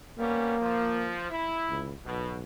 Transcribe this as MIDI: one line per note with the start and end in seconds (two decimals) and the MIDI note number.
0.19 0.55 55
0.19 1.16 58
0.19 0.55 59
0.19 0.55 61
0.61 1.29 53
1.30 1.85 64
1.69 1.94 37
2.05 2.44 35
2.05 2.36 47